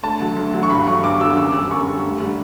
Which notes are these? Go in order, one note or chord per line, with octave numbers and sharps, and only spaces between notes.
D2 A5
D3 F#3
D2
D3 F#3
C#6
G2 B5
D3 F#3 C#6
G2 D6
D3 F#3 E6
D6
F#2 E6
D3 G3 E6
F#2 C#6
D3 G3
D2
D3 G3